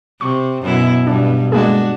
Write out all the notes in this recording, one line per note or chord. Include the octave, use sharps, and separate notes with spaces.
C3 C#6
F#2 B2 E4
G2 B2 D4
G#3 A#3 D4 F#4 G#4